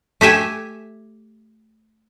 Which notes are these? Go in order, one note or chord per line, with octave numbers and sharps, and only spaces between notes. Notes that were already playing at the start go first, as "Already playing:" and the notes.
A3 G4 E5 G#5